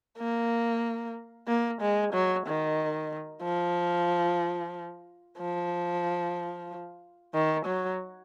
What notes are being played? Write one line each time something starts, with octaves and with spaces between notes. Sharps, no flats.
A#3
A#3
G#3
F#3
D#3
F3
F3
D#3
F#3